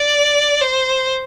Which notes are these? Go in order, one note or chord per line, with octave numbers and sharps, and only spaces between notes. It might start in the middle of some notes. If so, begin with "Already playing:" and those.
Already playing: D5
C5